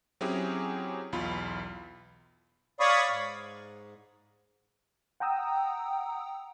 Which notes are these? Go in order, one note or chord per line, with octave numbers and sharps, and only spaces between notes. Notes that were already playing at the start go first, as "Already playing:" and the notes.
F#3 C4 C#4 E4 G4 G#4
B1 E2 F4 B5
C#5 D5 F5 B5 C#6 D#6
G#2
F#5 G5 A#5 D#6 E6